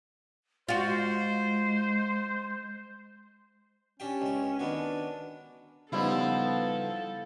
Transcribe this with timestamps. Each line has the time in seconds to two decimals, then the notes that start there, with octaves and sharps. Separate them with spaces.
0.69 G#3 F4 F#4 C5
4.00 C#4 D4 G4 G5
4.22 C#2 G5
4.59 D#3 B3 D4 F#4
5.92 C#3 F3 G3 B3 D#4 E4 A4